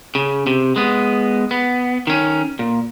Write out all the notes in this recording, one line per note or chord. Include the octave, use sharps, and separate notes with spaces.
C#3
C3
G#3 B3
B3
D#3 C#4
A#2